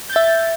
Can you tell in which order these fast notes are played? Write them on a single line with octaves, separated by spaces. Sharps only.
G6 A6 E5